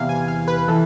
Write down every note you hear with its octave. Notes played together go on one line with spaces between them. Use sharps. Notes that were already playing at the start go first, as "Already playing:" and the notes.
Already playing: E2 C3 E3 F5
G#5
F5
B4
E3 A4